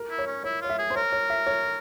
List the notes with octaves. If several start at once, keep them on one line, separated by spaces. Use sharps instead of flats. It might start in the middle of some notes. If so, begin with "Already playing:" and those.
Already playing: A#4
E4
C#5
C#4
E4 C#5
F4 C#5
E5
G#4
C5
A#4 C#5
C#5
E5
C#5